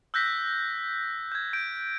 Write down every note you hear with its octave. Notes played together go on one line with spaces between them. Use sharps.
E6 F#6 G6 A#6 B6
G6 G#6
G6 D7